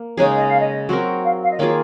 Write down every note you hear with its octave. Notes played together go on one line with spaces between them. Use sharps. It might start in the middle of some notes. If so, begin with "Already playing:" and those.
Already playing: A#3
C#3 G#3 D#4 G#4 C#5
D#5
F5
D#5
F#3 C4 F#4 A#4
F5
F5
D#5
D#3 A#3 F4 G#4 C#5